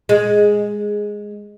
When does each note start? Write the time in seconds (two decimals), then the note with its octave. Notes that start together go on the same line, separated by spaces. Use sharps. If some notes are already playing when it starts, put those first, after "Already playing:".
0.09 G#3